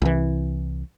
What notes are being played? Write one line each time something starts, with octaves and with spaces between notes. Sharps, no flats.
C2 E3